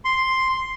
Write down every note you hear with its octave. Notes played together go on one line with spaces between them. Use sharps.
C6